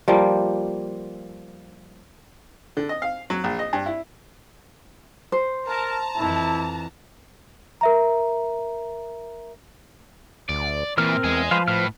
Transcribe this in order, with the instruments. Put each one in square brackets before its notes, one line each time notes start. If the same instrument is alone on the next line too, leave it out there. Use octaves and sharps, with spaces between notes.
[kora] F3 G3 A#3
[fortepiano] D3
D#5
F5
F#3
A#1
D#5
G2
E4
[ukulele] C5
[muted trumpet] A#4 [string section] A5 A#5
[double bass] F2 E3 [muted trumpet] E4
[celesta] A#4 E5 A#5
[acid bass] D2 [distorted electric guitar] D5
[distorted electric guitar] A#2 A#3 [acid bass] E3 [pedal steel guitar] C4 A#4 F6
[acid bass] E2 [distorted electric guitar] G#3 G#4
[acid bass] F3 [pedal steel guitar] B4 C5 F5
[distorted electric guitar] A2 [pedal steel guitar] B4 F6